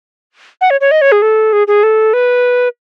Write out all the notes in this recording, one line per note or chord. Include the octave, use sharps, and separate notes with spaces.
F#5
C#5
C#5
D#5
C#5
G#4
A4
G#4
G#4
A4
B4